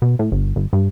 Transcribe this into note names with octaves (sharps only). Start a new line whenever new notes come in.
B2
A2
G1
G1
G2